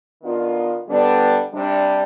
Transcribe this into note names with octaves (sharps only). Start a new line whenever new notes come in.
D#3 B3 D4 F4
D3 G3 B3 D4
C3 G3 D4